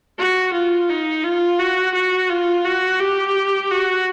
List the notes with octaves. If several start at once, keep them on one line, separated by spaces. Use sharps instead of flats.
F#4
F4
D#4
F4
F#4
F#4
F4
F#4
G4
F#4